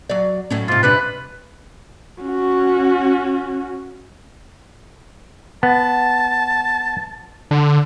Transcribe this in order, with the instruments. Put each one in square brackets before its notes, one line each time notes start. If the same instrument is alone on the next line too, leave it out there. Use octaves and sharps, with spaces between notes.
[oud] F#3 D5
A2 F#3 C#4
[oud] G#2 C3 [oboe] F4
[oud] G2 C3 D4 [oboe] B4
[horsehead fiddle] C#4 F#4
[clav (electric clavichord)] B3 [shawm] A5
[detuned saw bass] D3